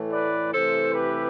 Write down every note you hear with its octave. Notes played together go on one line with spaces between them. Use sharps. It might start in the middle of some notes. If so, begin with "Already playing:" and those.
Already playing: A2 E3 A3
B4 D5
C3 E3 A3 A4 C5
G4 B4